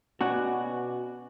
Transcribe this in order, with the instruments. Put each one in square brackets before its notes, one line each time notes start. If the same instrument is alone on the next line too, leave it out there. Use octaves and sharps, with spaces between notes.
[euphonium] B2 [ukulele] C#4 [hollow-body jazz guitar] F#4 [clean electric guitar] D5 F#5